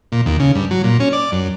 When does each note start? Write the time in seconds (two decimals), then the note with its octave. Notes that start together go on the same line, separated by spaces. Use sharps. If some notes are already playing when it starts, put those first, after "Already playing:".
0.12 A#2
0.26 D#2
0.40 C#3
0.55 G2
0.71 F#3
0.84 A#2
1.00 C#4
1.13 D5
1.32 F#2